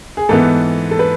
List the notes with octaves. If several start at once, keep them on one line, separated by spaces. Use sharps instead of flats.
G#4
G#2 E3 B3 A4
A4
B4